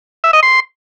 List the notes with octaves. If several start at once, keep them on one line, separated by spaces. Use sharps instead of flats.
E5
D#5
C6